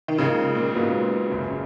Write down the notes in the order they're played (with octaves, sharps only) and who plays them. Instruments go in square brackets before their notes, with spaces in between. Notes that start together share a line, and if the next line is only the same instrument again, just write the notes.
[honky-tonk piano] D#3
[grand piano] G#2 F3 A#3 D#4 A#4 [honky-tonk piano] C#3
[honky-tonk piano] A#2
[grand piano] G#2 F#3 B3 F4
F#1 F#2 C#3